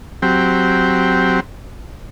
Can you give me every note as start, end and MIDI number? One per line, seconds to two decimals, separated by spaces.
0.22 1.40 54
0.22 1.40 60
0.22 1.40 67